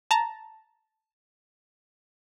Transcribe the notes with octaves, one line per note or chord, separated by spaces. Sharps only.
A5 A#5